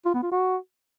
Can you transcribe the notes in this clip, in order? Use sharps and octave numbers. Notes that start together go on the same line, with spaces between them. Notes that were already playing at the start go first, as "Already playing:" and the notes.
F4
B3
F4
F#4